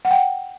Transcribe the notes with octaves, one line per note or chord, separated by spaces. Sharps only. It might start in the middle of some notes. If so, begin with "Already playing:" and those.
F#5
G5